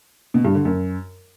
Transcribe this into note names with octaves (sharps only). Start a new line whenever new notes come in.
B2
G2
D3
F#2